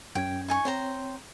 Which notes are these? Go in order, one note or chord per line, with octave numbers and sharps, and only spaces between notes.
F#2 C#4 G5 G#6
D#4 G#5 C#6
C4 C5 C#5 G5 A#5